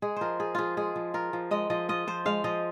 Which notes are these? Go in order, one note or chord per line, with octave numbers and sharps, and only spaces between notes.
G#3 G#4
F3 A#4 C5
F4 G#4
F3 F4 G#4
G#3 G#4
F3
F4 A#4
F3
G#3 D#5
F3 D#5
F4 D#5
F3 C5
G#3 F5
F3 D#5